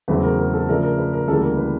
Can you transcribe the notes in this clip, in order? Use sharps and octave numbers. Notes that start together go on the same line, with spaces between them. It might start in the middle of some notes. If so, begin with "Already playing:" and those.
E2 C#3 F#3 A3 C4 B4
A#4
A#4
A4
C#3 F3 A3 D4 A#4
A#4
B4
A#4
D2 C#3 E3 G3 A#3 A4
A#4
B4